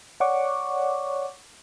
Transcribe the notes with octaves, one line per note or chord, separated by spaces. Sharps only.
C#5 D5 F#5 C#6 D6